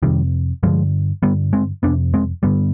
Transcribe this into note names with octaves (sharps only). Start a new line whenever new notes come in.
F2 C3 D#3 G3
G2 D3 F3 G#3
G2 D3 G3 B3
G#3 C4
F2 C3 B3 D4
G#3 C4
G2 D3 G3 B3